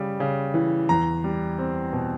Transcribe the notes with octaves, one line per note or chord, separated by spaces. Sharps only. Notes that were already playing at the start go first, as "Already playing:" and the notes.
Already playing: C#3 G3
C#3
E3
E2 A#5
G3
C4
B2